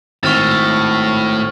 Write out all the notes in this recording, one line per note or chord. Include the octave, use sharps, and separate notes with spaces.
G#1 A2 C#6 F6 A6